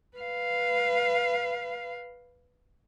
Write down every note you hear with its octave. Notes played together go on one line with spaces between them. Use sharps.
B4 F5